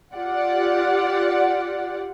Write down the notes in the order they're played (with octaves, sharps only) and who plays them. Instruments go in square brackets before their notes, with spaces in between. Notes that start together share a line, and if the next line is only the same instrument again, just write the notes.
[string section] F4 G4 D5 F#5